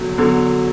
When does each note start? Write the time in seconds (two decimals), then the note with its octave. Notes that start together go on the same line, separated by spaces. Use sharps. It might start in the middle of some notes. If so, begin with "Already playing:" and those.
Already playing: E2 D3 F#3
0.18 E2 D3 F#3